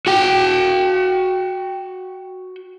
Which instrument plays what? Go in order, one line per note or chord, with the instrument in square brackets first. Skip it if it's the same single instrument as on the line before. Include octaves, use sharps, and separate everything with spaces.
[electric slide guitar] F#4 G5